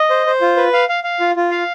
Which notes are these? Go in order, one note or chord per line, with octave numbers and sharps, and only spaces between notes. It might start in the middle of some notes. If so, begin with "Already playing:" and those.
Already playing: D#5
C5
C5
F4
B4
F5
F5
F5
F4
F4
F5